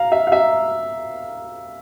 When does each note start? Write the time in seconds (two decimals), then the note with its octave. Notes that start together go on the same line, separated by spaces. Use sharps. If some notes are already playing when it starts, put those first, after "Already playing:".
Already playing: F5 A#5
0.12 E5
0.27 F5
0.32 E5